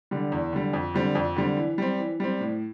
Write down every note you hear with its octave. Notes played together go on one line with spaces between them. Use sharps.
D3 G3
E2
D3 G3
F2
D3 G3 C4
F2
D3 G3 C4
E3
G3 C4
E3
G3 C4
A2